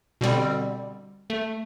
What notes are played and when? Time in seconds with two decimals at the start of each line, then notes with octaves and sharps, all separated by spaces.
0.21 B2 D3 G3 C4
1.30 A3